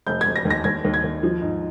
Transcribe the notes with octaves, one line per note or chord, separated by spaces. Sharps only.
F1 G6
G#6
F1
A#6
D#2
A#6
D#2 G#6
D#2
G#6
D#2
F3
G#2